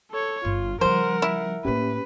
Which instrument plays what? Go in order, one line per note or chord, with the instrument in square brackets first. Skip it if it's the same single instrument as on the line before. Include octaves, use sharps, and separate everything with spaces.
[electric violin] A4 C#5
[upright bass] G1 G2 [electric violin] F4
[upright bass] C#3 C#4 [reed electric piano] F3 G3 [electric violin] A#4 F#5 [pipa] C5
[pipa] E4
[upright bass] A2 A#3 [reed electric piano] C#4 G4 [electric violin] B4